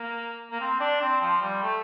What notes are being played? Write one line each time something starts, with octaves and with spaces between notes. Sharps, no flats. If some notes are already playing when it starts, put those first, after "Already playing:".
Already playing: A#3
A#3
C4
D4
C4
F3
G3
A3